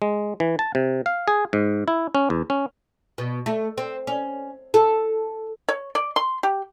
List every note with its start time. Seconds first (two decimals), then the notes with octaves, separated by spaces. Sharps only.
0.02 G#3
0.40 E3
0.59 A5
0.75 C3
1.06 F5
1.28 G#4
1.53 G#2
1.88 E4
2.15 C#4
2.30 E2
2.50 C#4
3.18 B2
3.46 A3
3.78 C4
4.07 C#4
4.74 A4
5.69 C#5
5.95 D5
6.16 C6
6.43 G4